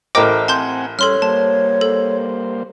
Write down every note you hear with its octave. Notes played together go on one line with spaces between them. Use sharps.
A1 A#4 C5 D#5 G5 D6
C4 F#5 G#5 A5 C6 G6
G3 C#4 A4 C#5 C6 F6
G3 A#3 C5 A5
A4